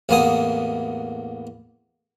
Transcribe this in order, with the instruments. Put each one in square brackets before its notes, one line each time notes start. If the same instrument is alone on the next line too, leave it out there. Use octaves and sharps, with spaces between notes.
[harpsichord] A1 E2 A#3 B3 G#5 D#6